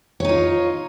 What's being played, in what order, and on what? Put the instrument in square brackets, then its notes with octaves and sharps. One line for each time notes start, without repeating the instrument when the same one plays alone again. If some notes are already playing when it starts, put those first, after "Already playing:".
[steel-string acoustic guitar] C#5
D#4
F4